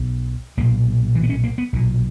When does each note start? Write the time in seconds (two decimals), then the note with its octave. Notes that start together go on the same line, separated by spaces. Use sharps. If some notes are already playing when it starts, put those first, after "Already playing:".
Already playing: B1 B2
0.57 B1 A#2 A#3
1.15 E3
1.23 B3
1.29 C#4
1.44 A#3
1.58 B3
1.73 B1 A#2